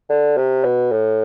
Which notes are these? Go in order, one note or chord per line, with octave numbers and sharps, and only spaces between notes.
D3
C3
B2
A2